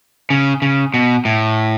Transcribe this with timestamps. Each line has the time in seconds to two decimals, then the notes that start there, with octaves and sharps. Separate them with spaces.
0.30 C#3
0.62 C#3
0.94 B2
1.25 A2